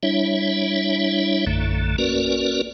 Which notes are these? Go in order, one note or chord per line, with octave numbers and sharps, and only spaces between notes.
G3 D4 E4 C#5 E5
A#1 F#2 D3 A3
A#3 C#4 F#4 A#4 B4 D5